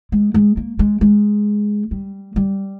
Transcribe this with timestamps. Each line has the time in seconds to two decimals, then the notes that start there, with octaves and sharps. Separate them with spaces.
0.12 G#3
0.34 G#3
0.57 A#3
0.79 G#3
1.01 G#3
1.91 G3
2.36 G3